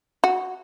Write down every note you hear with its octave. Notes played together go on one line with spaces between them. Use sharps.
F#4